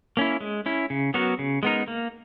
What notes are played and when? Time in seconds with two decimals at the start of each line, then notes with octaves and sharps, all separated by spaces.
0.17 A#3 C#4 E4
0.41 G#3
0.66 C#4 E4
0.90 C#3
1.14 F#3 B3 F#4 A#4
1.39 C#3
1.63 G#3 B3 D#4 A#4
1.88 A#3